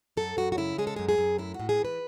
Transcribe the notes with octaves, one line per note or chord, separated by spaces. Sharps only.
F#2 A4
F#2 F#4
F#4
C#3 E4
G#3 G#4
A4
F#2 G#4
G#4
F#2
A2 E4
F#4
A2
G#4
E3
B4